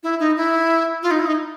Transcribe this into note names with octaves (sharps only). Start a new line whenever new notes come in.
E4
D#4
E4
F4
D#4
E4
D#4